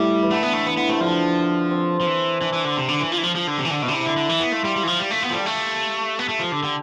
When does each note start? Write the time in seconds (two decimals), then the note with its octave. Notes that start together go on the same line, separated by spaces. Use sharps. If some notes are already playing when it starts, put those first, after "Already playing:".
Already playing: A2 G3
0.22 E3
0.31 D3 A3
0.43 B3
0.53 A3
0.66 E3 B3
0.77 D3 B3
0.89 C3 A3
1.01 D3 F3
1.71 C4
2.00 F3
2.07 E3
2.41 E3 D4
2.53 E3
2.65 D3
2.77 C3
2.88 D3
3.00 E3
3.12 F3
3.18 E3
3.23 F3
3.35 F3
3.47 D3
3.59 C3
3.65 E3
3.71 D3
3.82 B2 E4
3.88 D3
3.93 C3
4.06 D3
4.17 D3
4.29 E3
4.40 B3
4.52 A3 F4
4.65 G3
4.76 G3
4.83 E3
4.87 F3
4.99 G3
5.11 A3
5.23 B3 G4
5.30 F3 G3 A4
5.40 G4
5.46 A3
6.19 B3
6.28 A3 A4
6.40 F3
6.52 D3
6.63 D3 G4